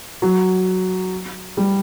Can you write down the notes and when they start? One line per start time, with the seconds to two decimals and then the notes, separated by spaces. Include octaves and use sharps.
0.22 F#3
1.57 G3